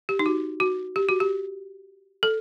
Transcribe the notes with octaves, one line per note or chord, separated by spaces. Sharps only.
G4
D#4
F#4
F#4
G4
F#4
G4
A4